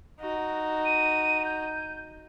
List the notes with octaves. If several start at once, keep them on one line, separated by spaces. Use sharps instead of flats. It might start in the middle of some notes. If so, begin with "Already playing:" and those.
D#4 F#4
D#7
G6